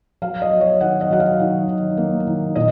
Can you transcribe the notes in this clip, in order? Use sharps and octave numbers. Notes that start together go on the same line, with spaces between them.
F#3 F5
D#5
F#3
C#5
D#3 F#5
D#5
F#3 F#5
F5
D#3
D#3
A#3
D#3
A#2 D#5